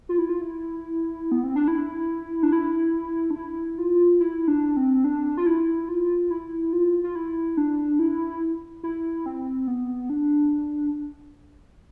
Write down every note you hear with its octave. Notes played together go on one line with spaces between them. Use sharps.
F4
E4
F4
E4
B3
C4
D4
E4
D4
E4
D4
E4
F4
E4
D4
C4
D4
F4
E4
F4
E4
F4
F4
E4
D4
E4
E4
C4
B3
D4